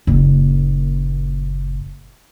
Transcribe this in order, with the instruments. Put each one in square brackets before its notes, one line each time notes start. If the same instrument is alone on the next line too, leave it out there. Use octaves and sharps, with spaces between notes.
[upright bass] F#1 A#2